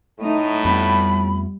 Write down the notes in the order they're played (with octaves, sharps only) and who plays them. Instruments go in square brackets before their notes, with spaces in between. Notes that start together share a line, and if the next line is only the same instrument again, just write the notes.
[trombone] A2 [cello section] A3 D#4
[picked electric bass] F2 A3 B3 [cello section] G3 [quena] B5